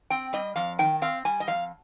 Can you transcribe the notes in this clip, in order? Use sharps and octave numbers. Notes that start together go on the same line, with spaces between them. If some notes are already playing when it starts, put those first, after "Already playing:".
C4 G5
G3 D#5
F2 F5
D#3 G5
C4 F5
G3 G#5
D#5
F2 F5